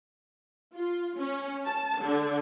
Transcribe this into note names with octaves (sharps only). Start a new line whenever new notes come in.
F4
C#4
A5
D3